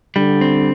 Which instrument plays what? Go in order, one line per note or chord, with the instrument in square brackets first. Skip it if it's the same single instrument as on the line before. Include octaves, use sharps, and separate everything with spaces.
[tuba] D3 [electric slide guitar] G3
[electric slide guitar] C4